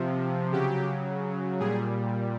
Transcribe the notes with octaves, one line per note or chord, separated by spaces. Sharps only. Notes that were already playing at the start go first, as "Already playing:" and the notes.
Already playing: C3 F3
C#3 F#3 G4
A#2 G3 G#4